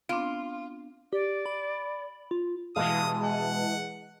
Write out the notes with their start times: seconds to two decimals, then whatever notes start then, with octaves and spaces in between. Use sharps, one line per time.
0.09 B3 C4 D4 F4
1.13 G4 D5
1.46 B5
2.31 F4
2.76 B2 E3 G3 G#3 F5 A5 D#6
3.25 F#5